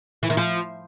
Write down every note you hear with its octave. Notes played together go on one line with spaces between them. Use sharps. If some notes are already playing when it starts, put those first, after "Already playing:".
E3
D#3
F3